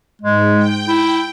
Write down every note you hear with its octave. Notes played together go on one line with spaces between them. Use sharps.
G#2 G#3
G5
E4